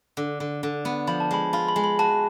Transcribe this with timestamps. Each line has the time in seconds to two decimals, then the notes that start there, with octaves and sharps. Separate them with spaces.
0.17 D3
0.40 D3
0.63 D3
0.85 B3
1.07 F3 B5
1.20 A5
1.31 G#3 B5
1.53 F4 B5
1.68 B5
1.76 G#3
1.84 B5
1.99 F#4 A5